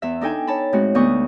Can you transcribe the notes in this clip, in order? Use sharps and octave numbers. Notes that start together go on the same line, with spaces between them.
E2 E5
D4 D#4 A4 G5 G#5
C#5 A5 B5
A2 G#3 C4 F#4
D2 B3 C#6 D#6 G6